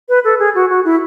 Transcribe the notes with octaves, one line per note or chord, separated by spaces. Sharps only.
B4
A4
G#4
F#4
F#4
E4